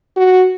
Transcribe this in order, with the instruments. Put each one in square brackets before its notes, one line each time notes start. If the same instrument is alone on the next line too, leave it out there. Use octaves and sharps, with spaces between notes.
[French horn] F#4